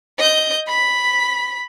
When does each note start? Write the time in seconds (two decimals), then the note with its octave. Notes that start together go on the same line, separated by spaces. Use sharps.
0.18 D#5 G6
0.68 B5 B6